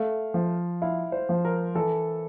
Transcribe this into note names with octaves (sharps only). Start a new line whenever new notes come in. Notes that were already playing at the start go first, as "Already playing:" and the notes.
Already playing: A3 F5
F3
E4 F5
C5
F3
A#4
E3 A4